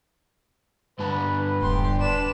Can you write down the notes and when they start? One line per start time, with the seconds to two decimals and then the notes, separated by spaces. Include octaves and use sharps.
0.99 G2 D3 B4 A5
1.61 D#1 G4 C6
2.00 D4 B4 E7